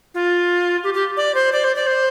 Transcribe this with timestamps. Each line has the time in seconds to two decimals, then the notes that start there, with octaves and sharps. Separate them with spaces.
0.14 F4
0.83 G4
0.94 G4
1.17 D5
1.34 C5
1.52 D5
1.64 C5
1.75 D5
1.87 C5